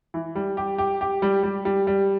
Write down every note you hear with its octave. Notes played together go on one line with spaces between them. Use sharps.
E3
G3
G4
G4
G4
G3
G3
G3
G3